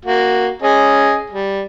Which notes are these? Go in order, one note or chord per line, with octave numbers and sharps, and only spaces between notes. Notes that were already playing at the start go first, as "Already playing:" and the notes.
A#3 F#4
C#4 G#4 D#5
G3